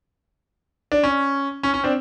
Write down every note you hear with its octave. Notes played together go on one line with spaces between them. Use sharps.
D4
C#4
C#4
C#4
C4 D4